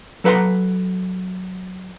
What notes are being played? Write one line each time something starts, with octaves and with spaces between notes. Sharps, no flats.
F#3 A4 B4 F#5 A#5 C6